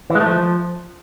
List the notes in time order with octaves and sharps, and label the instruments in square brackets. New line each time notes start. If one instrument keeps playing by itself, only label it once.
[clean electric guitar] E3
G#3
A3
F3